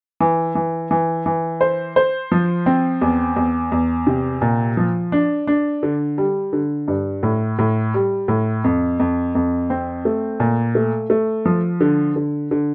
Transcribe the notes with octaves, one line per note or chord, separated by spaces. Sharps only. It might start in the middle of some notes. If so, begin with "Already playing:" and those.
E3
E3
E3
E3
C5
C5
F3
C4
E2
E2
E2
C3
A#2
F3
D4
D4
D3
G3
D3
G2
A2
A2
G3
A2
F2
F2
F2
C4
A3
A#2
A3
A3
F3
D3
D3
D3